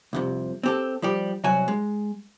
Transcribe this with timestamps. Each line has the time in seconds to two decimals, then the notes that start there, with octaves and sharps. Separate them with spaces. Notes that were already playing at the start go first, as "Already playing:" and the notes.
0.13 C2 F2 C3
0.63 C4 G4 A4
1.02 F3 G3 G4
1.44 C2 F#2 F#3 F#4 G#5
1.68 G#3